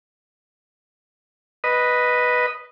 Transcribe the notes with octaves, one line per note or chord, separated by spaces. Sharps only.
B4 D#5